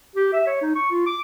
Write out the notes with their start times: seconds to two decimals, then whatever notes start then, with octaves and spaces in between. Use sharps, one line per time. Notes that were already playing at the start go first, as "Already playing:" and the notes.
0.16 G4
0.33 E5
0.47 C#5
0.62 D#4
0.75 C#6
0.90 F4
1.06 D6